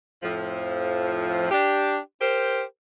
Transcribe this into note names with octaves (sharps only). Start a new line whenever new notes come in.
F2 A2 F3
D4 G4
G4 A#4 C5